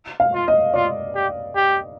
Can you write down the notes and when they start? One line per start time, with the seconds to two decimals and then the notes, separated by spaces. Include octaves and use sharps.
0.20 F5
0.34 F4
0.48 D#5
0.74 F4 D5
1.15 G4
1.56 G4